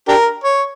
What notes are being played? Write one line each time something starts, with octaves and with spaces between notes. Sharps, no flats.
D4 G4 A#4
C#5